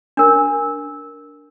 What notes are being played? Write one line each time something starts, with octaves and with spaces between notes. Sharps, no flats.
D4 A#4